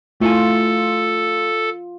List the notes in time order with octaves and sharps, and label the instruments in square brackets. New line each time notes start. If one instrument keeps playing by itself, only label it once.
[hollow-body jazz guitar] A3 E4 G#5 [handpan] F4 [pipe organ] A4